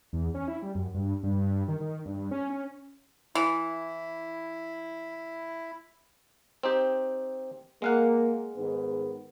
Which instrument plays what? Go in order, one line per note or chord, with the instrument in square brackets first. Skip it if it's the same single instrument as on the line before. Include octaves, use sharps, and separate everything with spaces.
[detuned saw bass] E2
C#4
E4
G3
F#2
G2
G2
D#3
D#3
G2
C#4
C#4
[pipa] E3 [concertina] E4
[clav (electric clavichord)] C4 D#4 G4
[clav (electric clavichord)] G#3 F5 F#5 [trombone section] A#3
[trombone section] G#2 D#3 B3